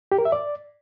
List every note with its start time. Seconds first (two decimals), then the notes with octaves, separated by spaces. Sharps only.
0.12 G4
0.18 A#4
0.25 E5
0.32 D5